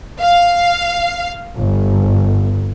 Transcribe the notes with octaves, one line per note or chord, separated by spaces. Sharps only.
F5
G1